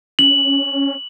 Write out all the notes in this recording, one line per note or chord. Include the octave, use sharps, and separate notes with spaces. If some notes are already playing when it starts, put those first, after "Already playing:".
C#4 F#7